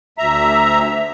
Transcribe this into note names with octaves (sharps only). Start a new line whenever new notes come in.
D2 E5 A#5